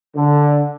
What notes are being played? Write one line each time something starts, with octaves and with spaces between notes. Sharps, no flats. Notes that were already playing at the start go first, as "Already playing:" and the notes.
D3